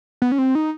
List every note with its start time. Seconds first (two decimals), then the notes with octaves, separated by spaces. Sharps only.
0.22 B3
0.32 C#4
0.38 C4
0.55 D#4